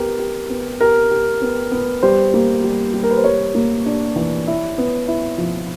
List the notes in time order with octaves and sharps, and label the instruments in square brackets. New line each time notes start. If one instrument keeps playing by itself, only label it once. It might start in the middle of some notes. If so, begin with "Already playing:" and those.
Already playing: [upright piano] B3 G4 [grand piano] A#4
[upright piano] G4
B3
[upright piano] G4 [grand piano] A#4
[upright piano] G4
B3
B3
[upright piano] G3 [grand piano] C5
[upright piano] A#3
G3
G3
[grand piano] A#4
B4
C5
[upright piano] G3 [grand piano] C#5
[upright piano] A#3
D4
E3
E4
B3
E4
F3